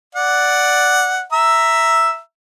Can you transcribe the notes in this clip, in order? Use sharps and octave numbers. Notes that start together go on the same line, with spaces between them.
D5 F#5
E5 A#5 E6